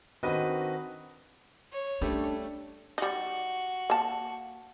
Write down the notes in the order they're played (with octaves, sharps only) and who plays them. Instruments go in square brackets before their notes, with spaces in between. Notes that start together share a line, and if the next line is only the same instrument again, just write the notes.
[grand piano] D#3 C4 D4 F#4 B4 D#5
[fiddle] C#5
[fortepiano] G3 A3 [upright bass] C#4 [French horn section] D4
[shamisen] G3 D#4 [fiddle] F#4
[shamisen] A#3 A5